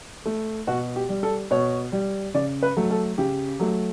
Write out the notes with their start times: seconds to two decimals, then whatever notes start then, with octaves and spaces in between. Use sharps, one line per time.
0.25 A3
0.67 B2 F#4
0.96 G4
1.09 G3
1.23 A4
1.51 B2 C#5
1.92 G3
2.34 C#3 D5
2.63 B4
2.77 F#3 A3
2.90 A4
3.18 C#3 G4
3.60 F#3 A3